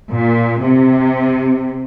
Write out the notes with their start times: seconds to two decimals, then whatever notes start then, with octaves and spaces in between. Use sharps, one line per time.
0.12 A#2
0.62 C3